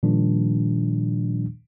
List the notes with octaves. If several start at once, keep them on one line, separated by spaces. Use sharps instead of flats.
A#2 D#3 F3 G3 D4